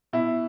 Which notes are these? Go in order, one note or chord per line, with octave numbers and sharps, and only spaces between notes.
B2 E4